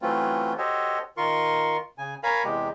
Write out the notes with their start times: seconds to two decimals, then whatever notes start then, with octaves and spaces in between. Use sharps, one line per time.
0.02 E3 F#3 A3 C4 C#4 F4
0.58 F#4 G4 A4 C5 C#5 D#5
1.17 D#3 F4 A#4 C6 C#6
1.98 C#3 G#5
2.23 A#4 C#5 F5 G#5 A#5 B5
2.44 E2 C3 G#3 G4